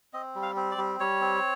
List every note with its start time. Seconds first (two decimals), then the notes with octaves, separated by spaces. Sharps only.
0.13 C4 D#5
0.35 G3
0.42 F5
0.56 C4
0.71 D5
0.78 G3
1.00 G3 C#5
1.21 C4